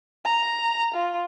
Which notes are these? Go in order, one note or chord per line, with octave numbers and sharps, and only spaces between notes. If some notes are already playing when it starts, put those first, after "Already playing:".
A#5
F4